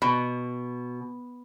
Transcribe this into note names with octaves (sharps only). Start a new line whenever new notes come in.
B2